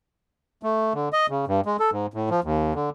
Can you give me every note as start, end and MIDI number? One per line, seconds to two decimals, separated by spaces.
0.63 0.93 57
0.94 1.09 50
1.13 1.27 75
1.30 1.45 49
1.47 1.61 43
1.66 1.77 56
1.79 1.90 69
1.92 2.06 44
2.14 2.30 45
2.30 2.40 53
2.44 2.74 39
2.75 2.90 50